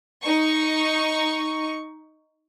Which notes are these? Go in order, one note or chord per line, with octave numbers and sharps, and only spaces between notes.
D#4 C#6